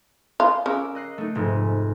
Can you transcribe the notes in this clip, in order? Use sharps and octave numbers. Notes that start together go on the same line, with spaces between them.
F4
C#3 A#4 D6 E6
D#5 F#6 C7
A3 D#4
F1 G#2